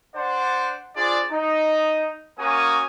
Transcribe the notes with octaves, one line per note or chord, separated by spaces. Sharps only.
D4 C5 D5 F#5
D4 F4 G#4 C5 D5
D#4
A#3 C#4 F#4 G#5 A#5 D#6